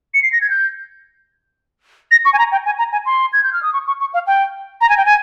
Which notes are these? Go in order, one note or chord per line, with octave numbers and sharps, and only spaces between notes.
C#7
C7
A#6
G#6
G6
A#6
C#6
G#5
A#5
G5
G#5
A#5
G#5
C6
G#6
G6
F6
D#6
C#6
C#6
C#6
F5
G5
A#5
G#5
G5
G#5